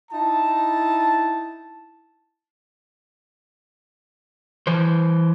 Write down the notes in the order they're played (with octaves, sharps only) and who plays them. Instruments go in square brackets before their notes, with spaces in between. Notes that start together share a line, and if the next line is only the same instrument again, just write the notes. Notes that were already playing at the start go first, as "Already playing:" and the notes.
[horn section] D#4 E4 A5
[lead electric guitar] E3 C5